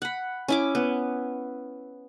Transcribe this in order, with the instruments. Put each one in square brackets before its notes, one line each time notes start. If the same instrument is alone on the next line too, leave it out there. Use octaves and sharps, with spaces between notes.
[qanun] F#5 B5
C#4 E4 D6
B3